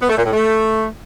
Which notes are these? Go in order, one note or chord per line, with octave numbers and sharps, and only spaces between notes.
B3
A3
A#2
A2
A3